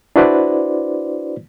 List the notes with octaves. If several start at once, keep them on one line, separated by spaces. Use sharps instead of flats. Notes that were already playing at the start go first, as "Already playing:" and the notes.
D4 E4 F#4 B4 C5 D5